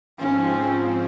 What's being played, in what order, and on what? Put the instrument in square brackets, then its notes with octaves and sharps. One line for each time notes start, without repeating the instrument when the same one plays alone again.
[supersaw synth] G#2 F3 C4 [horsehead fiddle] C#4